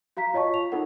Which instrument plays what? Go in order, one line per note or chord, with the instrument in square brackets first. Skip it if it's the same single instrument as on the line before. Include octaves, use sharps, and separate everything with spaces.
[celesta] F#4 F5 A#5 B6
F4 C#5 D#5 A5 C#6
F7
D#4 F4 A4 A#4 F#5